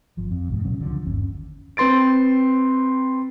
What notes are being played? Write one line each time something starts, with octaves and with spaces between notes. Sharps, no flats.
G#1 F3
F2
B1 F2 G#2
A#2 C#3 F#3 C#4
C#2 D3 F3
G1 D#2 C#4
C4 B4 C6 A6 D7